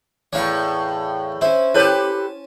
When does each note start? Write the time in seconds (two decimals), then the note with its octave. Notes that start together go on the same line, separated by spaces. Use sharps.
0.33 E2 A2 C#5 F5 C#6
1.41 C#4 E4 C5
1.74 E4 G4 A4 B4 C#5 G#5 A5